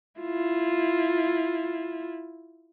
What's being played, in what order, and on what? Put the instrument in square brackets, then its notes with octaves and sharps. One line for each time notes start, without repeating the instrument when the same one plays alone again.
[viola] E4 F4